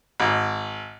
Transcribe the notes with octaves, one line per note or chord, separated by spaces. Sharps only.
G#1